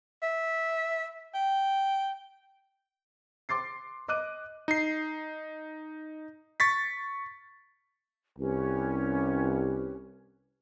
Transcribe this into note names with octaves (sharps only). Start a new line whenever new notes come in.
E5
G5
C6 D6 A6 C7
D#5 D6 F#6 D#7
D#4 C7
C#6 A6 B6
C2 C#4 G4 B4